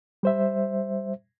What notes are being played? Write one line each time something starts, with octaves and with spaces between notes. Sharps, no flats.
G3 C5 E5